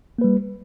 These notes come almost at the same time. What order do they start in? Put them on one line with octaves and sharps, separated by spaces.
A#3 B4 G3